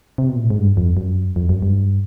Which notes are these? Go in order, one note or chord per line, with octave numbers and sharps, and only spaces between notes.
C3
B2
A#2
A2
G#2
G2
F2
F#2
F2
F#2
G2